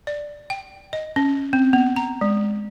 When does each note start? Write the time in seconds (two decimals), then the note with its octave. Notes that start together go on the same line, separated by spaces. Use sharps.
0.07 D5
0.50 G5
0.93 D#5
1.16 C#4
1.53 C4
1.73 B3
1.96 A#5
2.21 G#3